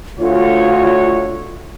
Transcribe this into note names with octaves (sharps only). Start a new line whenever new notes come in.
D2 F4 F#4 C#5